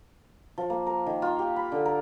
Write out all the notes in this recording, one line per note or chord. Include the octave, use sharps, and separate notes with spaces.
F3
A#3
A#4
D#3
F4
G4
B5
D3
A#4